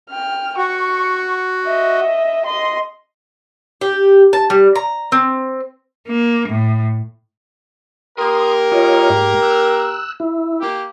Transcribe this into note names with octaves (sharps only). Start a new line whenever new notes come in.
G5 F6
F#4 C#6
D#5 E5
D#5 C6
G4
A5
G3
A#5
C4
A#3
A2
A#3 G4 A#4 C6 D#6
F4 C#5 D#5
G#2
E6 F#6
E4
A#3 G4